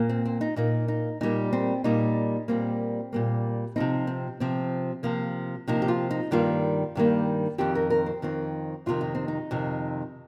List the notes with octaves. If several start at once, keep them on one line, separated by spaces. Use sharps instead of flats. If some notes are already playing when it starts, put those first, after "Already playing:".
Already playing: A#2 A#3
C4
C4
D#4
A#2 A#3 D#4
D#4
A#2 G3 A#3 D#4
C4
A#2 G3 A#3 D#4
A#2 G3 A#3 C4
A#2 G3 A#3
C3 F3 C4 D#4
C4
C3 F3 C4
C3 F3 A#3
C3 F3 A#3 D#4
G4
F4
D#4
G2 D#3 G3 A#3 F4
G2 D#3 G3 A#3
F2 D#3 C4 G4
A#4
A#4
C4
F2 D#3 C4
F2 C3 D#3 F4
D#4
C4
D#4
F2 C3 D#3